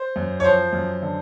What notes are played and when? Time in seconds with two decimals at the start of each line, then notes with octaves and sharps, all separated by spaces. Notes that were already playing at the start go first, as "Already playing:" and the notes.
Already playing: C5
0.16 F#2
0.40 C#5
0.44 F3 C5
0.73 F#2
1.02 D3